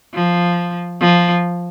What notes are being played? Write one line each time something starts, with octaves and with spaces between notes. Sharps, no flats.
F3
F3